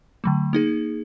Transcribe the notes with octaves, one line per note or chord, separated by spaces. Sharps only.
D3 F#3 A3
A#3 D#4 G#4